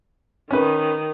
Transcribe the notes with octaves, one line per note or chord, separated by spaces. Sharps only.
D#3 C#4 B4